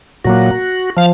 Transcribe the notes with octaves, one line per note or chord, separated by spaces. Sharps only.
A#2 F#3 A#3 F#4
F3 F5